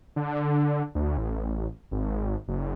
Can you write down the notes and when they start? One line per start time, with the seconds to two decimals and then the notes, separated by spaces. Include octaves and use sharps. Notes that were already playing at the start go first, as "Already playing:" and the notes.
0.16 D3
0.95 D2
1.17 A1
1.92 G#1
2.48 F#1